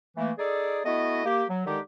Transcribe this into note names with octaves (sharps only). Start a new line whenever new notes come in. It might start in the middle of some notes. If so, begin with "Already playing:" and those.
E3 A3 A#3
D#4 G#4 A4 D5
A3 B3 E4 F#4 D#5
A#3 G4
F#3
D3 D#3 G#3 D#4 G4